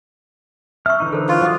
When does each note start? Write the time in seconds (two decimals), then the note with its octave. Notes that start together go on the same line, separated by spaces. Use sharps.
0.86 E5 C#6 E6 F6
1.00 D3 E3 D#4
1.13 A4 A#4 C5
1.29 F4 A#4 C5 C#6
1.41 F#3 F5 D6 D#6